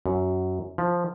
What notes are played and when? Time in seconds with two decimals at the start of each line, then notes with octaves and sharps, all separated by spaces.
0.06 F#2
0.78 F3